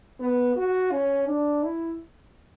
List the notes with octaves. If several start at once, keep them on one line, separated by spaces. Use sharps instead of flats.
B3
F#4
C#4
D4
E4